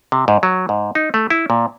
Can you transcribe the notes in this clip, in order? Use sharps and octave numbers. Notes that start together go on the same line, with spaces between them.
C3
G#2
F#3
G#2
D#4
A3
E4
A#2